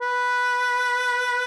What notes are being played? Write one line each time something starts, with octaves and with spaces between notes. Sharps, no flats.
B4